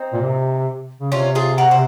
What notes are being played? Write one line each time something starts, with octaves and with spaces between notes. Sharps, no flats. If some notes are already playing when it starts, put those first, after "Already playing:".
Already playing: C4 D#4
A#2
C3
C#3
C3 C#4 F4
F4 G#4
F#4 A#4
C5